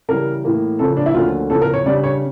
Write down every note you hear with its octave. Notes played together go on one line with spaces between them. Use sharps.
C#3 E3 G3 A#4
A2 E3 A#3
C#3 F3 A#3 C#4 A4
D4
E4
D2 D3 F3 A#3 C#4 F4
E2 C#3 F3 A4
A#4
C#5
C#3 G3 D4 D5
C#5